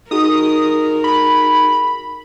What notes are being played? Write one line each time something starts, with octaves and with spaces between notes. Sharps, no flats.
D#4 F#4 G#4 A#4 D#6
B5